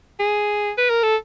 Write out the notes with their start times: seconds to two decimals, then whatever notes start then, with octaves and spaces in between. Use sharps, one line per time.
0.19 G#4
0.78 B4
0.90 A#4
1.03 A4